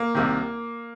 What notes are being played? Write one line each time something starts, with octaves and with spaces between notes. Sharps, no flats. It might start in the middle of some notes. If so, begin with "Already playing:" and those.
Already playing: A#3
C2 C3 D#3